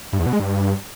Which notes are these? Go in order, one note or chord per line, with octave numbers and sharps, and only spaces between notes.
G2
E2
B2
G#3
G2